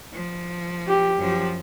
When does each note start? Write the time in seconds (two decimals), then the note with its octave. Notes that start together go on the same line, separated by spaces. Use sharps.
0.13 F3
0.87 G4
1.17 F#2 F3